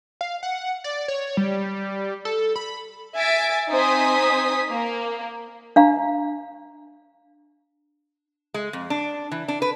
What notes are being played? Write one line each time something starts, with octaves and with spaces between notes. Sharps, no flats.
F5
F#5
D5
C#5
G3
A4
B5
E5 G#5 A6 B6 D7
C4 D#4 C5 G#5 D#6 B6
A#3
D4 F5 A#5
G#3
F2
D4
E3
D4
B4